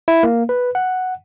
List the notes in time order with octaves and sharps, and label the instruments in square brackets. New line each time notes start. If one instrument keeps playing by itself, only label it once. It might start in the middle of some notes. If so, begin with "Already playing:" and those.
[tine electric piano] E4
A#3
B4
F#5